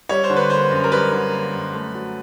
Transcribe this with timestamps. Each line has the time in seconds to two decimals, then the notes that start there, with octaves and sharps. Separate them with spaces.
0.09 G3 C#5
0.24 C5
0.30 D3
0.36 B4
0.50 A#3 C5
0.70 F#2
0.84 A#4
0.91 G3 B4
1.12 D3
1.33 A#3
1.52 F#2
1.74 A3
1.94 F#3